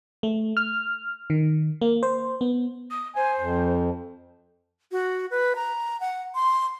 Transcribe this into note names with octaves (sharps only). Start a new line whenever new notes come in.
A3
F6
D#3
A#3
C5
B3
D#6
C5 G#5
F2
F#4
B4
A#5
F#5
C6